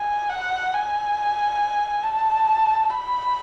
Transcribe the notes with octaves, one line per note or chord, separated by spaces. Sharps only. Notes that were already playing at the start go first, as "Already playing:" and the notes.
Already playing: G#5
F#5
G#5
A5
B5